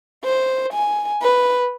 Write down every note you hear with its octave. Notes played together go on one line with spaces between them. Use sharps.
C5
G#5
B4